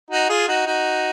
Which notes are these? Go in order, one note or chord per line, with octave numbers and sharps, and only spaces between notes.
D#4 F#4
F4 G#4
D#4 F#4
D#4 F#4